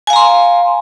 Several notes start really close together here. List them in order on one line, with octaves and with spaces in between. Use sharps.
G#5 F5 A#5 C6